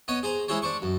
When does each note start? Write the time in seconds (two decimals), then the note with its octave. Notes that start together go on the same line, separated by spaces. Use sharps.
0.08 B3 C#5 D#5
0.23 G#4 C5 A#5
0.48 G#3 E4 G#4 C5 C#5
0.62 D4 C5 C#6
0.82 F#2